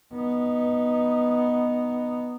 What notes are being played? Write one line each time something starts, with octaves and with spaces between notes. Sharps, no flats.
B3 D#4